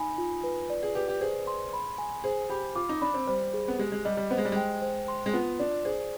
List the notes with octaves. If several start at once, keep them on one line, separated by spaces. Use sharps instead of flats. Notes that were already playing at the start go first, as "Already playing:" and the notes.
Already playing: D#4 G#5 B5
F4
B4
D5
G#4
G4 B4
G4
G#4 C5
C6
B5
G#5
G#4 C5
G4 B5
F4 D6
D#4
D4 B5
C4
G3 C5
G#4
B3
G#3 G4
G#3
G3 D#5
G3
B3 C5
G#3
G3
G#3 G5
C5
C6
G#3
B3 F4
D4 D5
G#4 C5